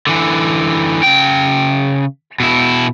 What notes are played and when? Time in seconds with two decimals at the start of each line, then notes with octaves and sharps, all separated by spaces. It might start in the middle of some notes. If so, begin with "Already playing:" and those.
0.07 D3 E3
1.03 C#3 G5
2.40 B2 E4